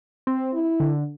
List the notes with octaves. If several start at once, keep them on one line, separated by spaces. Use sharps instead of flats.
C4
E4
D3